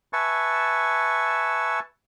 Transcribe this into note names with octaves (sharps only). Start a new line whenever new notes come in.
B4 E5 G#5 A5 C#6